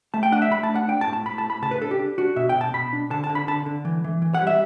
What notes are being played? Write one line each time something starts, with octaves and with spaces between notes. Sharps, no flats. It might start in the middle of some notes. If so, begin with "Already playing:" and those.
A3 A5
G5
D4 F#5
E5
A3 B5
A5
D4
F#5
D4 G5
A5
A2
A5
A2 B5
A5
A2
B5
C#3 A5
B4
D4 A4
G4
D4
D4 F#4
B2 E5
G5
B2
A5
B2 B5
D4
D3 A5
A5
D3
B5
D3 A5
D3
E3
E3
E3
F#5
G3
E5